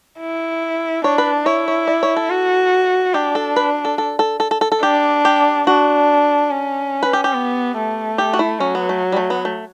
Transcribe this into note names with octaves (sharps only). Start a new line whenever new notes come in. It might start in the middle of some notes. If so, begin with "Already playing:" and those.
E4
D4 C#5
B4
E4 C#5
C#5
D5
C#5
A4
F#4
D4 G4
A4
B4
A4
A4
A4
A4
A4
A4
A4
D4 G4
G4
D4 F#4
C#4
B4
G4
G4
B3
A3
G4
F#4
E4
F#3 C#4
B3
A3
G3
A3
B3
A3